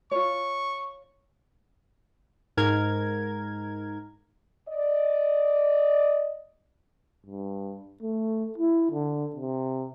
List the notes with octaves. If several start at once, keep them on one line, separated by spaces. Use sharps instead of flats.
F4 C#5 C#6
G#2 A#4 G#6
D5 D#5
G2
A3
E4
D3
C3